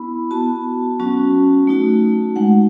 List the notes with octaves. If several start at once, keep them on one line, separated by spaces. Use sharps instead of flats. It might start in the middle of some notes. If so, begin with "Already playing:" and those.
Already playing: B3 E4 B5
B3 F#4 A5
F#3 C#4 F#4
A3 D#4 F#4
G#3 D#4 F#4 F#5